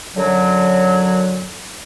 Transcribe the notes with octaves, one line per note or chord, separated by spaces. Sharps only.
F#2 D3 F#3